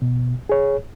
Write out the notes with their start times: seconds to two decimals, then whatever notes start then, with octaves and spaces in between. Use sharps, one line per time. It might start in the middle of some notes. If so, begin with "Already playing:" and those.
0.02 B2
0.49 G#4 C#5